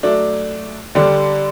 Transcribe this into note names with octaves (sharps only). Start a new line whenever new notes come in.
F#3 A3 D4
D3 G3 D4